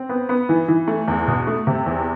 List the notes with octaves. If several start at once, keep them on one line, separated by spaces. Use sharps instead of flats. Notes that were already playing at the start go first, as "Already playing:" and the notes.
Already playing: C4
B3
B3
E3
E3
A3
E2
B2
A3
C3
E2